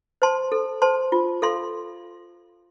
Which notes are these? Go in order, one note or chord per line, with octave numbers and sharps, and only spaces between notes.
C5 A5 C6
A4
C5 A5 C6
F4
A4 F5 C6